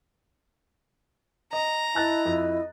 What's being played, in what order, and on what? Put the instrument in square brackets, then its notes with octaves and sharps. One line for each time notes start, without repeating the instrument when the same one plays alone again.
[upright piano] D#5 [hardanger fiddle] A#5
[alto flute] E4 [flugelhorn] D#5 [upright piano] A5 F#6 A6
[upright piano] F2